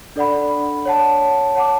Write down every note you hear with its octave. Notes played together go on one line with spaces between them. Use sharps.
D4 A4 D5 F#5 B5
C#5 F#5 A5
C#5 F#5 A5 D6